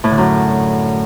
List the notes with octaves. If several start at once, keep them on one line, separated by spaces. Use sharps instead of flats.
A2
D3
F#2